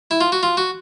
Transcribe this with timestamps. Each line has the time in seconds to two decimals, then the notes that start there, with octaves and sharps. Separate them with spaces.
0.11 E4
0.21 F4
0.32 F#4
0.43 F4
0.57 F#4